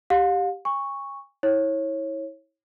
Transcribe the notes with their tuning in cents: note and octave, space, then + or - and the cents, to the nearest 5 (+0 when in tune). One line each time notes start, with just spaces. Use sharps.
G4 +0 F5 +40
G#5 -35 C#6 +0
E4 -30 C#5 -20